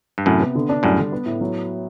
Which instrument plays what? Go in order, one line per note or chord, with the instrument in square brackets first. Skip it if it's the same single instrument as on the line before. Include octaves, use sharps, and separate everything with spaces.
[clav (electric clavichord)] G2
[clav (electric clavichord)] F#2 A2 [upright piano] C3
[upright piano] B3
D3
D4
[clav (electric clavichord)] F#2 A2 [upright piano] G3
[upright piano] D3
B3
A2
F#3